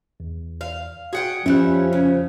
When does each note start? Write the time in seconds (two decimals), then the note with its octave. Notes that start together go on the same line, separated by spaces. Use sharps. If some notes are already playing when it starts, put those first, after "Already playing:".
0.20 E2
0.61 F5
1.13 F#4 G#4 F#5 G5
1.46 F2 F3 G3 C#4 E5 F#6
1.93 C#3